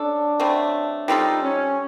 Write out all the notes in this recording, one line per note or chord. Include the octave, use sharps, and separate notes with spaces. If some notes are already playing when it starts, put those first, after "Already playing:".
Already playing: C#4 D4 A4
C#3 F#3 A3 C4
G3 C4 D#4 F4 A4
C#4